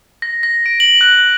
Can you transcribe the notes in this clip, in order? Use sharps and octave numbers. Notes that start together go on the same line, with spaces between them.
A#6
A#6
D7
F#7
F#6